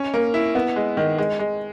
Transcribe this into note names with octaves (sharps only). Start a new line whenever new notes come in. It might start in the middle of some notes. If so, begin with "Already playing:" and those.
Already playing: C#4
A#3
E4
B3
G#3
D#3
G#3
G#3